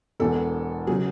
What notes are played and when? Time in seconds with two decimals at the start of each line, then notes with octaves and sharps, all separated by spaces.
0.20 E1 E2 B2 A4
0.87 C#3 F#3 G#4